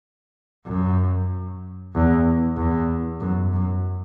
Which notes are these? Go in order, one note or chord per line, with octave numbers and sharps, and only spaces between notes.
F#2
E2
E2
F#2
F#2